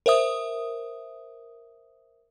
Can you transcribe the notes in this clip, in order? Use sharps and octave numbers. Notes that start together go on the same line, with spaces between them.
A#4 C5 E5 D#6